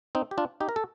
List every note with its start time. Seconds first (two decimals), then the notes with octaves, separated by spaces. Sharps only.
0.15 C4 D#4
0.31 G4
0.38 D4 F4
0.60 D#4 G4
0.69 A#4
0.76 A4